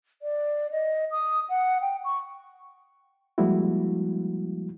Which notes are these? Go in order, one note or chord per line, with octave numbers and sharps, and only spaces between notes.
D5
D#5
D#6
F#5
G5
C#6
F3 G3 G#3 A#3 E4 F#4